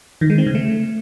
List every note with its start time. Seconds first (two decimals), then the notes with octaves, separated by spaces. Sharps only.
0.21 D#3
0.30 G#3
0.38 C4
0.47 C#3
0.55 A3